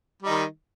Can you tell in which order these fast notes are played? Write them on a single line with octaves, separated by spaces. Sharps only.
G3 D#4 D#3